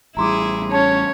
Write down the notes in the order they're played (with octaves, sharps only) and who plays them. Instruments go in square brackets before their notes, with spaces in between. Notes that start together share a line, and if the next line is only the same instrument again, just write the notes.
[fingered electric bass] A1 G3 [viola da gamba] E4 G#4 [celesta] A#5 C6 D6
[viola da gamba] C#4 [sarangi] C#5 [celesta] A5